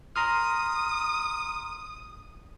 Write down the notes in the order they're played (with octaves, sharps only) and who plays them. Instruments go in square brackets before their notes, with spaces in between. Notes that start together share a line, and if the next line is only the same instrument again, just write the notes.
[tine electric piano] A#5 C6 F6 [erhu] D#6